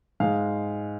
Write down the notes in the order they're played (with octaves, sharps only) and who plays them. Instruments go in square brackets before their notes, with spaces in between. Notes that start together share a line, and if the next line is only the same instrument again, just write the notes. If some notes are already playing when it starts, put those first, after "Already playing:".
[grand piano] G#2 G#3 F5